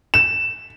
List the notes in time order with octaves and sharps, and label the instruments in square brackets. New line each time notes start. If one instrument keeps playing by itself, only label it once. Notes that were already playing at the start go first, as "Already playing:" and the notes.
[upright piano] E7